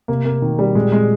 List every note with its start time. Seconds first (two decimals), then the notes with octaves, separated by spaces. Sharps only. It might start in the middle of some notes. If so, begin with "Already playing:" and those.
0.08 C3 A#3
0.25 A#3
0.42 B2 D#3
0.59 G3
0.75 A#2 G#3
0.92 G#3